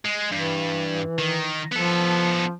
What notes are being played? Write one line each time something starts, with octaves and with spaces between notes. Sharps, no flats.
G#3
G2 E3
D#3
F3 B3 A4